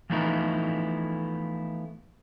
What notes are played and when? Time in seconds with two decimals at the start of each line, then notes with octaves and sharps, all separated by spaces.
0.10 E3 F3 A3 B3 D#4 E4